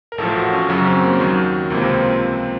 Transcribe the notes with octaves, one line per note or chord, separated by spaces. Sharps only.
A#4
A1 A2 F3 A4
F#4
C#4
F#2 C#3 F#3 C#4
C4
A#3
D#2 D#3 F#3
C#2 C3 F3 A#3
C4